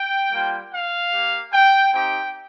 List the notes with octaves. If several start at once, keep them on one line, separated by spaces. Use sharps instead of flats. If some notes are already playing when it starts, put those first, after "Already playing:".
Already playing: G5
G3 A#3 F4
F5
A#3 G4
G5
C4 D#4 G4 G5